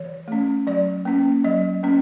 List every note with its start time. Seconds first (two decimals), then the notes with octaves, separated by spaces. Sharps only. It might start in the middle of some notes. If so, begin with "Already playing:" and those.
Already playing: E3 C#5
0.28 A3 C#4
0.67 F#3 D5
1.05 A#3 C#4
1.44 F#3 D#5
1.83 A#3 C#4